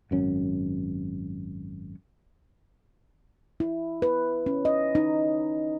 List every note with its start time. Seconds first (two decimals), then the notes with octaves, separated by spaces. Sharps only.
0.11 G#1 F#2 C#4
3.60 E4
4.02 B4
4.46 C#4
4.65 D#5
4.95 D#4